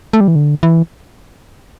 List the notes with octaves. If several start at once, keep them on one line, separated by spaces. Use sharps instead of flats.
A3
G3
E3
D3
E3